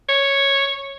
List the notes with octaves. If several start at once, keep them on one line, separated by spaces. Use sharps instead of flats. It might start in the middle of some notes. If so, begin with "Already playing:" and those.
C#5